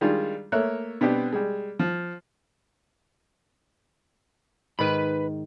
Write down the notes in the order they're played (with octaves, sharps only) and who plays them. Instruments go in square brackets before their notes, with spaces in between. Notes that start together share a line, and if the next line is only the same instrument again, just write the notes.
[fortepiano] D#3 G3 G#3 D4 F4
A3 A#3 C#5 E5 F#6
B2 B3 C4 D4 G4
G3 G#3
F3
[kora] G#2 D#3 [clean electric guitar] B4 B5